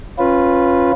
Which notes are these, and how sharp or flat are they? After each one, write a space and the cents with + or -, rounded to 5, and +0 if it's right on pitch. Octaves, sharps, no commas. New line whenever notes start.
C#4 -20 F4 +0 B4 -5